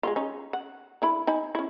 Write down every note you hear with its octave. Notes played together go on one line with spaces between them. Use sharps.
G#3 B3 F4
C#4 D#4
F#5
D3 E4 B5
D#4 G#5 B5
C#4 E4